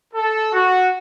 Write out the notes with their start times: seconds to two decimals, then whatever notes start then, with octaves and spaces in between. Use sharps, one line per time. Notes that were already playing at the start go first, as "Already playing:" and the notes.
0.13 A4
0.53 F#4